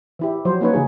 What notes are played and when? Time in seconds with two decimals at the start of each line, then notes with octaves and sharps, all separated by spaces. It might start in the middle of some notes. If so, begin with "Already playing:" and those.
0.19 E3 E4 G4
0.45 F3 F#3 C5
0.61 A#3 C#4 D#4 B4 C#5
0.74 C#3 E3 G3 D#4 G#4